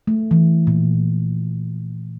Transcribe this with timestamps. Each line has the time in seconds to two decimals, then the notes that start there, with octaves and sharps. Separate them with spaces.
0.07 A3
0.31 E3
0.67 A#2